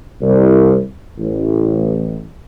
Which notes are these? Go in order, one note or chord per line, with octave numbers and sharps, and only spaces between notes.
C2
A1